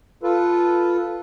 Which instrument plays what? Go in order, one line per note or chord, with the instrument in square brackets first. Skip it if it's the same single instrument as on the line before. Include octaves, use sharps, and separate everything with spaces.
[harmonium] F4 A4 B4